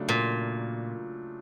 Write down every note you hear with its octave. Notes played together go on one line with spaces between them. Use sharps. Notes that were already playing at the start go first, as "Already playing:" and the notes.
Already playing: C#3 F#3 A3 D4 F4
A#2